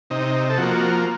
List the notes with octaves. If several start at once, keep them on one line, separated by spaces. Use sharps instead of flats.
C3 D#4
A4
F3 A#3 F#4